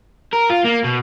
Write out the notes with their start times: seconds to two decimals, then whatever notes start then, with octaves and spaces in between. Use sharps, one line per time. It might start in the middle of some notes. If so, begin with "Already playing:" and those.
0.33 A#4
0.50 F4
0.65 A#3
0.84 B2